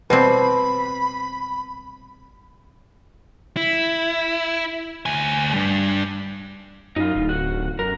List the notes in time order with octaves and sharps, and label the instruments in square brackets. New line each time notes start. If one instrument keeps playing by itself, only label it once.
[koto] B2 G3 C4 [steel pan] B4 [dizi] B5
[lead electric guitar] E4
D2 G#5
G3 D4
[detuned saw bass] F#2 [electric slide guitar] D#4 F4
[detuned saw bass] D1
[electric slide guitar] F#4
[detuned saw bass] F#2 [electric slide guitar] A#4